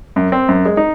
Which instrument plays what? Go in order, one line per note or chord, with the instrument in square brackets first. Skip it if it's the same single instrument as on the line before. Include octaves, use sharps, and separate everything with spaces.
[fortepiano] F#2
C4
F#2
G#3
D#4